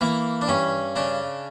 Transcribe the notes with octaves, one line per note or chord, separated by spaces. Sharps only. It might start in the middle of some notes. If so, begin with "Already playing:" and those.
E3 A#3
D4
G2 C#4
C#3 D4